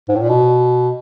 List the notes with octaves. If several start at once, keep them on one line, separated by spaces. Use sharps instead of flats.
G#2
A2
A#2
B2